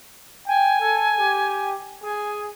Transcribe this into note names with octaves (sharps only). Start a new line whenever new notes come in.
G5 G#5
A4
G4
G#4 G#5